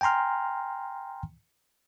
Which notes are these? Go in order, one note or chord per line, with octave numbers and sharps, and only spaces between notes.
G5 G#5 A#5 C6 F6